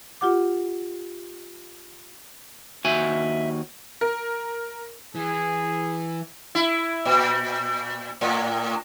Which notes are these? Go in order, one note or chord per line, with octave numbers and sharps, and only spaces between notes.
F4 G4 F#5 D6
D#2 F#4 E5 G#5
A#4
E3 G#4
E4
A#2
A2